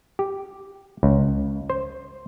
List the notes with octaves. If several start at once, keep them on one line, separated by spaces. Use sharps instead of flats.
G4
C#2
C5